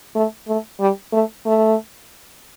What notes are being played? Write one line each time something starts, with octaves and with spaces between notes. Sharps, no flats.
A3
A3
G3
A3
A3